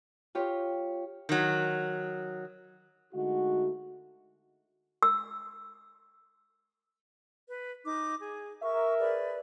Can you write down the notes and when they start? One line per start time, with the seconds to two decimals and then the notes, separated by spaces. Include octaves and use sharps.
0.35 F4 G4 C#5
1.29 D#3 F#3
3.14 D3 G#3 A3 D#4 F#4
5.03 E6
7.48 B4
7.84 D#4 D6
8.19 G#4
8.62 A#4 E5 C#6
8.98 G#4 B4 D5